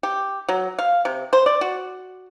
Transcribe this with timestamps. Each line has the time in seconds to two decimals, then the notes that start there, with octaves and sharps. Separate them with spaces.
0.03 G4
0.49 F#3
0.79 F5
1.05 C3
1.33 C5
1.46 D5
1.61 F#4